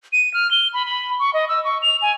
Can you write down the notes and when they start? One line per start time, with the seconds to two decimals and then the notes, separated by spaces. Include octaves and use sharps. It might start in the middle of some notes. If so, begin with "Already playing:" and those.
0.13 D#7
0.34 F6
0.51 G7
0.74 B5
0.86 B5
1.19 C#6
1.34 D#5
1.49 E6
1.65 C#6
1.82 F7
2.02 G#5